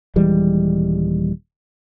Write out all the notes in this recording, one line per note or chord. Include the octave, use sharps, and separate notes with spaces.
D#1 E3 G3 G#3